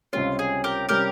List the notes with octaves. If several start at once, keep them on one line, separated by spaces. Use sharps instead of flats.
C#2 C3 G3 C#4 F4
G#4
G4 A#4
C3 G3 C#4 G4 A#4